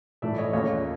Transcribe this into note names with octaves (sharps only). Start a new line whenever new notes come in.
A2 E3 A3 D5 E5
C#5 D#5
D#2 C#3 F3 A#3 C#5 D#5